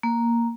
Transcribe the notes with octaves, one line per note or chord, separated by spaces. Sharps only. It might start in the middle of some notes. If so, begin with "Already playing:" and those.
A#3